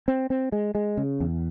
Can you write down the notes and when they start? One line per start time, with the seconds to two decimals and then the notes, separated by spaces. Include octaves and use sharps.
0.08 C4
0.30 C4
0.52 G#3
0.75 G#3
0.97 C#3
1.20 E2